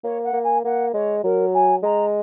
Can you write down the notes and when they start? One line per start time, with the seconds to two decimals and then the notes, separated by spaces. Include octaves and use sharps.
0.04 A#3 C#5
0.24 F#5
0.33 A#3
0.43 G#5
0.64 A#3 F#5
0.94 G#3 C#5
1.24 F#3 A#4
1.54 G#5
1.83 G#3 A#5